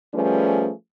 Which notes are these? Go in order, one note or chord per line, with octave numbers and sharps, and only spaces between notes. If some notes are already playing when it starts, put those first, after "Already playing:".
F3 G3 A3 C#4 G#4 B4